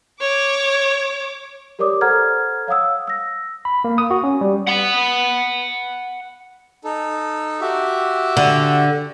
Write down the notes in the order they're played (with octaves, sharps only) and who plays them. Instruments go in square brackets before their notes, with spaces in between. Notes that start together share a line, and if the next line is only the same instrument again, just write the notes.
[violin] C#5 D6
[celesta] G4 A#4 C#5 D5 D6 D#6
A4 C5 F#5 A#5 F6 G#6
C#5 F5 F#5 D#6 E6
E6 A#6
[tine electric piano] B5
A#3
D#6
F#4
C#4
G3
[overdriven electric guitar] F#5 B5
[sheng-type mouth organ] D#4 A4
F#4 G4 E5
[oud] D3